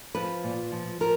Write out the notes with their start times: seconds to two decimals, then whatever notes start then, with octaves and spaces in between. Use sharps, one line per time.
0.15 F3 B4
0.44 A#2
0.72 F3
1.00 F3 A#4